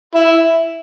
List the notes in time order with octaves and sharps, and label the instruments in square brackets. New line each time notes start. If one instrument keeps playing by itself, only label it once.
[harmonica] E4